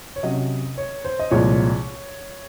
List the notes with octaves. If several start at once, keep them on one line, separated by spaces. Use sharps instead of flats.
C#5
C3 F#3 C#4 D#5
C#5
C5
D#5
C2 A#2 F3 G#3 C#5